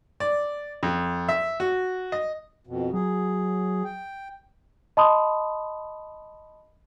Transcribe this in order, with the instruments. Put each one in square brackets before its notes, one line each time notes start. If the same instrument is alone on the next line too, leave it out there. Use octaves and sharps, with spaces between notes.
[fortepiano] D5
F2
E5
F#4
D#5
[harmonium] F2 B2
[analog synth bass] F#3 [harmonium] G#4
[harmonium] G5
[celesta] D#5 A5 B5 C6 D#6